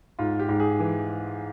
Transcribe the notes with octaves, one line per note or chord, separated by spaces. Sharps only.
G#2 F4
G4
G#2
G#4
E3